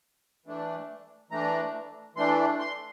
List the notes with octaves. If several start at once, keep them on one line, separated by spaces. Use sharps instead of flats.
E3 A3 D4
E3 A3 D4 A#5
E3 A3 D4 C6
C6